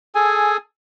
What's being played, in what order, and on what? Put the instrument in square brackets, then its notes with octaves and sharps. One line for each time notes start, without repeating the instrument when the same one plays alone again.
[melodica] G#4 A4 G#5